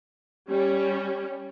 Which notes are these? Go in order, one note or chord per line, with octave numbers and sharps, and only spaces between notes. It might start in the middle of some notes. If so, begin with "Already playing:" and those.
G3 C#4